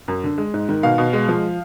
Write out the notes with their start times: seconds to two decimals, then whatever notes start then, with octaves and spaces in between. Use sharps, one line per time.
0.08 F#2
0.24 D3
0.38 G#3
0.54 G#2
0.69 D#3
0.83 B2 F5
0.98 B2
1.13 G#3
1.29 F3